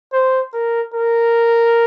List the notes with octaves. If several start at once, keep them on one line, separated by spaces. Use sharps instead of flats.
C5
A#4
A#4